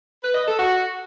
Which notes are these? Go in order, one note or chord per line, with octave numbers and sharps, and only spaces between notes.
B4
D#5
A4
F#4